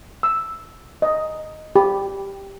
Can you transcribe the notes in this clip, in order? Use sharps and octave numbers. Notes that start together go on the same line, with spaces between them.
E6
D#5
G4